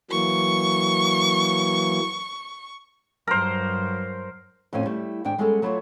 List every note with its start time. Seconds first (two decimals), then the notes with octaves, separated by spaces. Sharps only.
0.11 E3 F#3 A#3 C#6
3.27 G2 F#3 A#4 C5
4.73 F2 A2 C4 C#4 G5 G#5
4.86 G3 A3 E4
5.25 G#2 D#3 D4 G5
5.38 G3 G#3 B3 C#4 G#4 A4
5.62 F#3 A3 E4 F4 B4 C#5